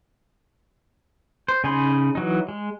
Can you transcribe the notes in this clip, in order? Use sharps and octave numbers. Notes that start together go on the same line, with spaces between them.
C5
C#3 D#4 G#5 B5 C6
E3 F#3 D#4
G#3